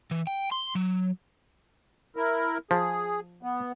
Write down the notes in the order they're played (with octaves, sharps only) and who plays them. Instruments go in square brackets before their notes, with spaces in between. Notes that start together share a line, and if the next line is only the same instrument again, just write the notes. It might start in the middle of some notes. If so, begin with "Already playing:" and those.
[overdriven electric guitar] E3
G5
C6
F#3
[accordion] E4 A#4
[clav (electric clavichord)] F3 [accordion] G#4
[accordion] B3